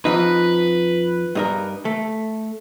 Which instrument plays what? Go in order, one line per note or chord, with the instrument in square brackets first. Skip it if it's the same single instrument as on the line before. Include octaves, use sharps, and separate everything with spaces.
[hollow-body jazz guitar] F2 F3 D#4 [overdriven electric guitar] B4
[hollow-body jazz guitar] G2 D#4 A#4
A3